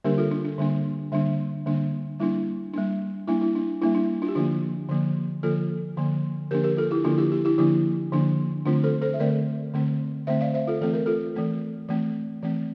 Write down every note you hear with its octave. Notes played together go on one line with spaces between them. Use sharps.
D3 G3 A#3 D4 G4 A#4
F4 A4
D4
D4
D3 G3 A#3 D4
D3 G3 A#3 D4
D3 G3 A#3 D4
G3 A#3 D4 E4
G3 A#3 D4
G3 A#3 D4 E4
E4
D4
G3 A#3 D4 E4
D4
D4 F4
G4
D3 F3 A#3 D4 F4
D3 F3 A#3
D3 F3 A#3 F4 A4
D3 F3 A#3
D3 F3 A#3 D4 G4 A#4
G4 A#4
F4 A4
E4 G4
D3 F3 A#3 D4 F4
E4 G4
E4 G4
E4 G4
D3 F3 A#3 D4 E4 G4
D3 F3 A#3 D4
D3 A3 C4 D4 F4
A4 C5
A4 C5
E5
D3 A3 C4 A#4 D5
D3 A3 C4
D3 A3 C4 C5 E5
D5 F5
C5 E5
F4 A4
E3 A3 C4 A4
A#4
F4 A4
E3 A3 C4
E3 A3 C4
E3 A3 C4